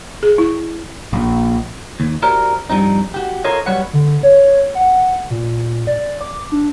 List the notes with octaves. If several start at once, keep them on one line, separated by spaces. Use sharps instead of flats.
G#4
E4
A#1
D#2
E4 F#4 G4 A#4 C5 D5
G2 F3 G3 C4 D#4
F#4 G4
F4 A4 A#4 C5 C#5 D#5
F#3 G3 B4 C#5 F#5
D3
C#5
F#5
A#2
D5
D6
D4